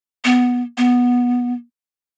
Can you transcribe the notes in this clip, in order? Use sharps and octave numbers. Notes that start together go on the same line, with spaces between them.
B3
B3